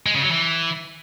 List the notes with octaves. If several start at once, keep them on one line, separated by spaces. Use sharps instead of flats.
G#3
C#3
F#3
E3